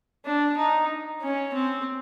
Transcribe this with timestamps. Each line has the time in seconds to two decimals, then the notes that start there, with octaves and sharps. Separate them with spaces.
0.25 D4
0.57 D#4
1.21 C#4
1.54 C4